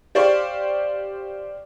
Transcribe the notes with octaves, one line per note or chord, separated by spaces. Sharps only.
G4 C5 D5 F5 C#6